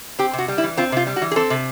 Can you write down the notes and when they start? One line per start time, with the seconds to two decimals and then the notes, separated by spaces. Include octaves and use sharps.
0.19 C4 G4
0.33 C3
0.38 F#4
0.48 G3
0.58 E4
0.63 E3
0.77 C4 F4
0.92 C3 F4
1.07 G3
1.16 F#4
1.22 E3
1.31 G#4
1.36 C4 A4
1.50 C3